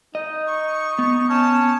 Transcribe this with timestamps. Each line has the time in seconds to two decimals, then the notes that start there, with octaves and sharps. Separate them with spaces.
0.15 D#4 D#5
0.46 C#6
0.99 B3
1.29 C#4 A5